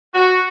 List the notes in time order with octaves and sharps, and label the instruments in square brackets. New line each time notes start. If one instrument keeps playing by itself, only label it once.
[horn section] F#4